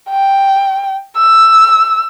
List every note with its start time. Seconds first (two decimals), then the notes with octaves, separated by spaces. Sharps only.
0.10 G5
1.17 E6